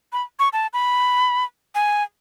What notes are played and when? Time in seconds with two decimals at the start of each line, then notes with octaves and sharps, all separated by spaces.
0.13 B5
0.39 C#6
0.53 A5
0.73 B5
1.75 G#5